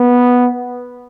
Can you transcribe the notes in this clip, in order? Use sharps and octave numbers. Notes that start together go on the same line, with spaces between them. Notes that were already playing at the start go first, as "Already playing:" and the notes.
Already playing: B3